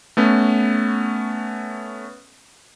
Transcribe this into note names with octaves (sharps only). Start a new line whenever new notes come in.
A3 B3 C#4